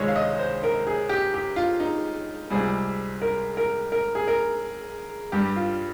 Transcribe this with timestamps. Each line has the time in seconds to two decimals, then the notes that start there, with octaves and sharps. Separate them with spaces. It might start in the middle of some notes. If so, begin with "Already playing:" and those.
Already playing: C#2 C3 D#3 G#3 C#5
0.08 F5
0.16 D#5
0.39 C5
0.63 A#4
0.87 G#4
1.09 G4
1.34 G4
1.56 F4
1.80 D#4
2.50 C#2 C3 G3 G#4
3.22 A#4
3.57 A#4
3.92 A#4
4.15 G#4
4.28 A#4
5.32 G2 G3 G4
5.56 F4